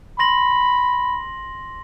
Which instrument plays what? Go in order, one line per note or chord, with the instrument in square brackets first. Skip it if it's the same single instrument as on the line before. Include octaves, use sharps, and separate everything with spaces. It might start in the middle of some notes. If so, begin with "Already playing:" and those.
[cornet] B5 [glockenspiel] C6 A#6 F#7